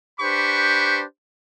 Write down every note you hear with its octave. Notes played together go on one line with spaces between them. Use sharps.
D4 G4 B4 C5 B5 C#6